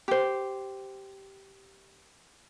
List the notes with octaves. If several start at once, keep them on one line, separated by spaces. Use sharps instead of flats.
G4 C5